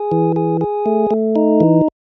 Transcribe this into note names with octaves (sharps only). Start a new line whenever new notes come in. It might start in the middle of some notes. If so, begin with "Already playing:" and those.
Already playing: G#4
E3
G#4
G#4
A3
A3
D#4
E3